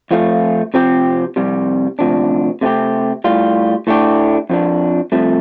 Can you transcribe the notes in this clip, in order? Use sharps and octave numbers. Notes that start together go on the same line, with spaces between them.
F2 F3 A3 F4
C3 F3 C4 G4
F2 C3 G3
D2 C3 F3 D4
C3 A3 C4 G4
A2 G3 F4
A2 A3 D4 G4
F2 F3 D4
C2 C3 F3 A3